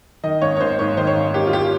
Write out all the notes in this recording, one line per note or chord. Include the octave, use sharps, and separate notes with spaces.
D#3 D#5
G#1 C#5
C#5
G#1 C5
G#2 C#5
D#3 C5
C#5
G#1
G#1 G4
F4
G4